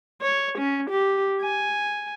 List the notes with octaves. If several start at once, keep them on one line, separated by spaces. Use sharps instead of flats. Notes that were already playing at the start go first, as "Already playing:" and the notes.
C#5
C#4
G4
G#5